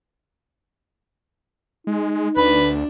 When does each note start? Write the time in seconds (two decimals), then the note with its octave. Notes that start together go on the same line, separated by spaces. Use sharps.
1.87 G#3 D#4
2.37 D2 D4 B4